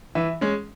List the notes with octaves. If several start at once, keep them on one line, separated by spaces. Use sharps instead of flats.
E3 E5
G#3 C#4